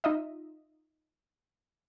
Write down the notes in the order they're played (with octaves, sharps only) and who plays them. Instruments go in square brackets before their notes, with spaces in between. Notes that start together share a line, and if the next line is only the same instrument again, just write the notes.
[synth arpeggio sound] D#4 F4 D#5 E5